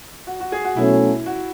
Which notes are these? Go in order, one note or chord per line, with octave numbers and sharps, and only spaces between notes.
F#4
F#4
G#4
F#4
B2 F#3 A3 C#4 E4
F#4